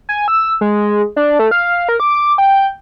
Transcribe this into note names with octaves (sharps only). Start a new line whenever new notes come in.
G#5
E6
G#3
D4
A3
F5
A#4
D6
G5